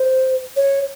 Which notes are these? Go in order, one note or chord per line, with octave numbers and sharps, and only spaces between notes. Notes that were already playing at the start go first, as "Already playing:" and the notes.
Already playing: C5
C#5